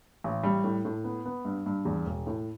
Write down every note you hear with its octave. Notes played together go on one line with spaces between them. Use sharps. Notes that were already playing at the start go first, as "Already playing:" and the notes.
A1
G3
A2
A2
B3
B3
G2
G2
E2
E1
A2